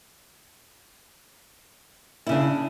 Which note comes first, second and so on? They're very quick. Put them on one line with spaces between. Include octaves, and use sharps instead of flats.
E4 C#3 D4